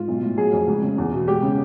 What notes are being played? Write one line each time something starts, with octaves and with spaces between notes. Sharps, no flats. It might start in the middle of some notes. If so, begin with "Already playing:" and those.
Already playing: G#2 F4
B1
A2
F#3 G#4
F2
C#2
C#3
E2
B2
G#3 G4
C#3